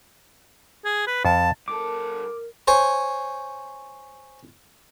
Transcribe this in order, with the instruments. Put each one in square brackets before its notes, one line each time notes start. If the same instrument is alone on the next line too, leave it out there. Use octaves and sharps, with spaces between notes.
[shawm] G#4
B4
[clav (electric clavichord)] F2 [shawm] A5
[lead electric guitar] G2 A4 [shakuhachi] A#4 [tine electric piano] D6
[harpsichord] C5 C#5 G#5